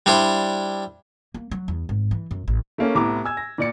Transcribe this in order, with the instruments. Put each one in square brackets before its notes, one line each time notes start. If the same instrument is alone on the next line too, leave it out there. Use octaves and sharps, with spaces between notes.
[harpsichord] G3 D4 E4 C5
[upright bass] A#3
F#3
E2
G#1
E3
F#2
A1
[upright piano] A3 A#3 C#4
C2 A2 B3 A#5 D6
G#5 E6 G#6
A#6
A#2 D5 C#7